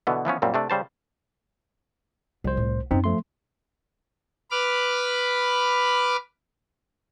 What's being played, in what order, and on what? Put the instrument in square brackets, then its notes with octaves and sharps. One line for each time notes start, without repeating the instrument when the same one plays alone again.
[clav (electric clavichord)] B2 D3 E3 B3
E3 F3 B3 C#4
F#2 A#2 G3 C4
C3 A3 D4
C#3 G3 C5 A5
[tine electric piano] C2 C5 [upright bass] F3
[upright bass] A2
[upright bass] F#2 B3 [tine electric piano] C4 D#4
[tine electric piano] F3 A3 C6
[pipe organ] B4 B5 D6 F6